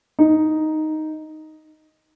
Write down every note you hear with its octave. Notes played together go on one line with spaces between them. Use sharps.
D#4